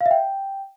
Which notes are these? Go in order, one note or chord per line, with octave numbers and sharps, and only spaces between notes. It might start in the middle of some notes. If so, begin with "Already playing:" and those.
F5
E5
G5